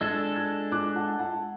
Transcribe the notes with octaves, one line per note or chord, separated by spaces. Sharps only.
G#3 D4 A4 E6 G#6
E6 G#6
D6 F#6
F#5 A5
F#5 A5